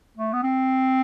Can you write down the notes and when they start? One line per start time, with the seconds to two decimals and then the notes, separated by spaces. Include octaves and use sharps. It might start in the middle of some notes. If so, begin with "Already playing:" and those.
0.17 A3
0.33 B3
0.43 C4